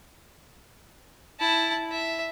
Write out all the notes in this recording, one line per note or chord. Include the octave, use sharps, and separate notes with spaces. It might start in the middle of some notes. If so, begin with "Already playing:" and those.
E4 A5
E5